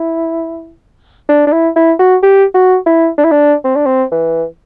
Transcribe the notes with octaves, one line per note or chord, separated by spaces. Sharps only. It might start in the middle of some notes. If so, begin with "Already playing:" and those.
Already playing: E4
D4
D4
E4
E4
F#4
G4
F#4
E4
D4
E4
D4
C4
D4
C4
E3